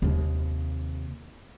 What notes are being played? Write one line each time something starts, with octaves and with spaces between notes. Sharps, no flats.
D#2 C3